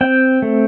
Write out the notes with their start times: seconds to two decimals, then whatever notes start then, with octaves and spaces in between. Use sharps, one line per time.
0.01 C4 G5
0.42 A3